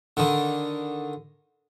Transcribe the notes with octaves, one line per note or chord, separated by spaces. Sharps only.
D3 D#3